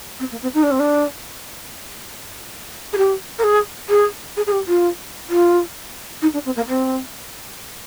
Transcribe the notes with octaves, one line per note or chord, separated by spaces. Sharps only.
C4
A#3
C4
D#4
D4
C4
D4
G#4
G4
A#4
G#4
G#4
G#4
G#4
G4
F4
F4
D#4
D4
C4
A#3
C4